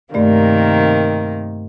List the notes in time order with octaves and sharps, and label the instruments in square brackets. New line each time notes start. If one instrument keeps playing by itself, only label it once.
[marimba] G2 A3 D5 [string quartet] C3 D#3 A#3